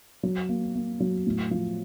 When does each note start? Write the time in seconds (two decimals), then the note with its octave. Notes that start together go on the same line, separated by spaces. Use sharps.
0.23 F#3
0.49 A#3
0.75 A#3
1.00 F#3
1.27 A2
1.51 F3